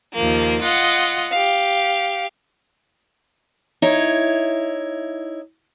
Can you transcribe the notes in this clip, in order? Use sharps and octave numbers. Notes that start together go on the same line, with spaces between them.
D#2 F3 A#3
F4 D#5 F#5
G4 F5
D#4 E4 C#5